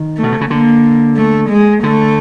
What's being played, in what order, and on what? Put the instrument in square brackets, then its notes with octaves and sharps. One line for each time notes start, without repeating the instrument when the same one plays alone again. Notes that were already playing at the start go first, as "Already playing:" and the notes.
Already playing: [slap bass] D#3
[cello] A3
[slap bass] B2
C3
C#3
[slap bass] D3 [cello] A#3
[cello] A3
G#3
[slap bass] D3 [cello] A3